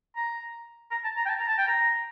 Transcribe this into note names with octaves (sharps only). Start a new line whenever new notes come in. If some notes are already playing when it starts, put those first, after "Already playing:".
A#5
A#5
A5
A#5
G5
A5
A#5
A5
G5
A#5